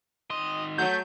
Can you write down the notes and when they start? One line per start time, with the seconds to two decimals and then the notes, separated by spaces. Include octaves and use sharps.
0.30 D#3 D#5 C6
0.78 F#3 A3 G6